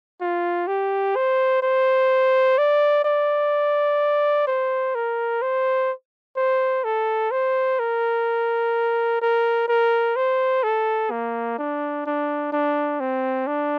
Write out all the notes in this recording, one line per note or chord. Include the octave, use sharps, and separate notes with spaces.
F4
G4
C5
C5
D5
D5
C5
A#4
C5
C5
A4
C5
A#4
A#4
A#4
C5
A4
A#3
D4
D4
D4
C4
D4